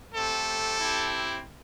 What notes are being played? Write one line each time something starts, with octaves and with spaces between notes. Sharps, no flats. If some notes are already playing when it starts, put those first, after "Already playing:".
A3 C4 G4 A4
C4 E4 G4